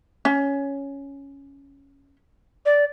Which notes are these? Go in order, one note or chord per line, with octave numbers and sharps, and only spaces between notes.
C#4
D5